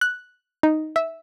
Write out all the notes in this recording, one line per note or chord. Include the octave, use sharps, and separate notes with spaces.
F#6
D#4
E5